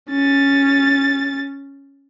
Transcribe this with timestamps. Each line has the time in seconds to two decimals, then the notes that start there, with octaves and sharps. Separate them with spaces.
0.10 C#4 A6